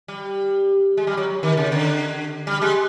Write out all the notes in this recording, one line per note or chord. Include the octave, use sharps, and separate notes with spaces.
G3
G#3
G3
F#3
D#3
C#3
D3
G3
G#3